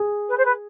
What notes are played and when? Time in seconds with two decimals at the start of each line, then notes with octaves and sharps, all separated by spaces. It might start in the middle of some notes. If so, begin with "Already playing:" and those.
Already playing: G#4
0.29 B4
0.37 C5
0.45 B4